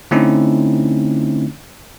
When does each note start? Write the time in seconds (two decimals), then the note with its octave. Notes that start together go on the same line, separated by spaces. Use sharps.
0.11 D3 A3 C4 C#4 D#4 E4